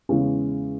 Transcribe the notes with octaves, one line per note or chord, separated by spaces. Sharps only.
E2 C#3 E3 G#3 C#4